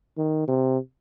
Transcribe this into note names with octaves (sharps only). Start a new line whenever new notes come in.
D#3
C3